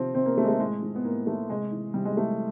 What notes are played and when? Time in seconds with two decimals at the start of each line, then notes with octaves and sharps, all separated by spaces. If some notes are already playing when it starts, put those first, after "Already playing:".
Already playing: C3 F3 C4
0.15 C3 C4
0.26 A#3
0.37 F3 A3
0.44 G#3
0.48 A3
0.60 A2 G#3
0.83 F3
0.96 B3
1.04 A2 A#3
1.27 F3 A3
1.50 C3 G#3
1.72 E3
1.94 C3 G3
2.05 G#3
2.17 E3 A3